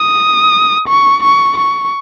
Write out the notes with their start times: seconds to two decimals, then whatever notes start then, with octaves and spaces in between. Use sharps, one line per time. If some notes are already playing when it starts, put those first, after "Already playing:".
Already playing: D#6
0.88 C#6
1.23 C#6
1.57 C#6